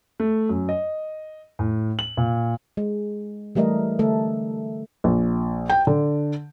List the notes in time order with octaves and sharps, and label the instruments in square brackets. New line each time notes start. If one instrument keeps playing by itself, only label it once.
[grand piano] A3
F#2
D#5
A2
F#7
A#2
[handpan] G#3
E3 G3 A3 A#4 D#5 E5
D3 A3 A4 E5
[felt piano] A#1
G5
D3